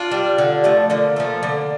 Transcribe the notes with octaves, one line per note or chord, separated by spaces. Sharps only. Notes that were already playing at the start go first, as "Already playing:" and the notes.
Already playing: D4 F4
G3
D3
F3 A3
D3 A#3
F3 A3
D3